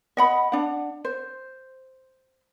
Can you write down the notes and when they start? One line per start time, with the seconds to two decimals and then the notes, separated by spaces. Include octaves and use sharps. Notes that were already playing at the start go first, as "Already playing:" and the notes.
0.17 D#5 F#5 B5
0.52 D4 F#5
1.05 C5